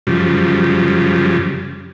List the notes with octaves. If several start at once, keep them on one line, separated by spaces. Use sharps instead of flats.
F#2 C#3 F3 G3